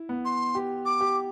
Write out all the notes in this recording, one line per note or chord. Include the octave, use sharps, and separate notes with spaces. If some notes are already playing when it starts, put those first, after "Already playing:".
Already playing: E4
B3
C6
G4
D6
G4